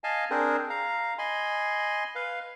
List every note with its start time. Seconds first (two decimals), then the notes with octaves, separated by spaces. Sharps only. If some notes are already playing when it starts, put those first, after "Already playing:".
0.04 D#5 F5 G#5 A5
0.30 C4 D4 G#4 A#4 C5
0.70 F5 A#5
1.18 D#5 G#5 B5 C6
2.15 B4 F5